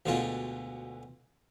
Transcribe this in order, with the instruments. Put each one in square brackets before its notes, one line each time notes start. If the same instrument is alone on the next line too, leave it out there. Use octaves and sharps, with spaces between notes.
[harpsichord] D2 B2 D3 G#3 F4 A5